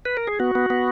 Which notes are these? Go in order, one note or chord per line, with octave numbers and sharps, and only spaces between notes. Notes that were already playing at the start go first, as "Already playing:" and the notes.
B4
A#4
G#4
B3 F#4
B3
B3